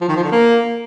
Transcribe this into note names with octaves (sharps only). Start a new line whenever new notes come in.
F3
D#3
F3
D3
A#3